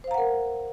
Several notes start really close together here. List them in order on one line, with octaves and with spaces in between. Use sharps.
C5 F5 A#5 F#5 A#4